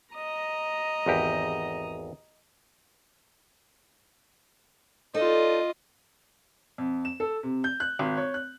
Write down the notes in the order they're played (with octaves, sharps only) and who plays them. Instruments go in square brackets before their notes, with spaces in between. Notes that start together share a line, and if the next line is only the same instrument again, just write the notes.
[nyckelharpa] D#5 A#5
[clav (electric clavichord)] G#1 E2 G4
[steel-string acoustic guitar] D#4 A4 D5 [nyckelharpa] F4 D#5
[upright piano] F2
E7
A4
C3
G6
F#6
G#1
C#5
F#6